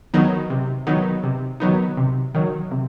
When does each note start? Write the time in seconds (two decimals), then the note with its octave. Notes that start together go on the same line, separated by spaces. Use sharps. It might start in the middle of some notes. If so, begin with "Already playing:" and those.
0.14 D#3 F#3 B3 D#4
0.50 C3
0.87 D#3 F#3 B3 D#4
1.23 C3
1.60 D#3 F#3 B3 D#4
1.97 C3
2.34 D#3 F#3
2.71 C3